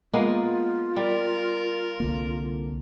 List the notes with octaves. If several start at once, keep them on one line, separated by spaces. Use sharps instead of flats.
G#3 A#3 B3 F4
G3 A#4
C2 D3 A#3